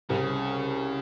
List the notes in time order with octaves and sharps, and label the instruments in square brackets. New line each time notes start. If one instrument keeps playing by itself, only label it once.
[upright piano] C2 [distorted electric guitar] C#3